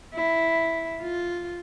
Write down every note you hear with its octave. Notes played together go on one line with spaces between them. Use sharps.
E4
F4